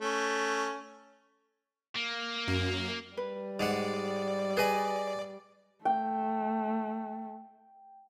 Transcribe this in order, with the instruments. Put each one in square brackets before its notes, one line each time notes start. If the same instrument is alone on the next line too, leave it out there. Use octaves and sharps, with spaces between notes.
[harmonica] A3 C#4
[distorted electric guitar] A#3
[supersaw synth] F#2
[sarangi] G3 [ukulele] B4
[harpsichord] G#2 G#3 F#5 [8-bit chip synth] D5
[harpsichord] G#4 D#5 B5 [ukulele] B4 G#5
[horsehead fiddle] A3 [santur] G5